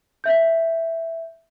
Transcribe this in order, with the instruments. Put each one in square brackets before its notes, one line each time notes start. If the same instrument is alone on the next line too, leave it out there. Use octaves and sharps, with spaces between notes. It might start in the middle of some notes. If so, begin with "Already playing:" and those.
[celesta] E5 G6